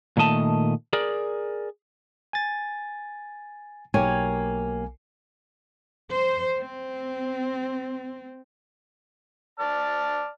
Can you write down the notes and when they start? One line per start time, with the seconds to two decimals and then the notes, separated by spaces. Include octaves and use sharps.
0.17 A#2 D#3 A3 D#5 A5
0.93 G#4 A#4 D5
2.33 G#5 A6
3.94 B1 A#3 G4 C#5 G#5
6.10 C5
6.58 C4
9.60 D5 A5 F6